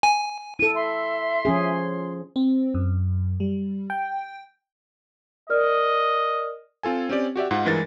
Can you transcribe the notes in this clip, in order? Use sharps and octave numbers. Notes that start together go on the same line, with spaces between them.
G#5
E4 A4 D#7
E5 C6
F3 C#4 G#4
C4
F#2
G3
G5
A#4 D5 D#5 F6
C4 F4 A4 G#5
C4 C#4 G4 D5
F#4 G4 D5 E5
G#2 F4 F#5
G2 E3 G#3 A#4 A6